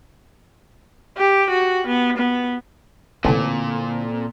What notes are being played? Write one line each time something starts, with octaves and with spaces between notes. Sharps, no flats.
G4
F#4
B3
B3
A1 A#2 D3 C4 E4 A4